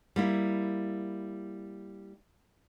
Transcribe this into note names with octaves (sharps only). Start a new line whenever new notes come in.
G3 A#3 E4